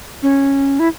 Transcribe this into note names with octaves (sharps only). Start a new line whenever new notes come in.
C#4
E4